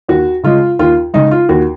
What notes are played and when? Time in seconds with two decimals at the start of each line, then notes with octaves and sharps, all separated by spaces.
0.08 D#2 F#4
0.43 C#3 G#3 F4
0.79 D#2 F4
1.14 C#3 G#3 D#4
1.31 F4
1.49 D#2 F#4